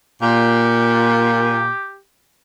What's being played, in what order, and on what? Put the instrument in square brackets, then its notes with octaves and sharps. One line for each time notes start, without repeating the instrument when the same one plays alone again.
[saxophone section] A#2 [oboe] G4